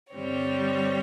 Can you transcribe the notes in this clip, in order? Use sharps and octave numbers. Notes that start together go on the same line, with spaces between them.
G2 D3 G3 C4 C#5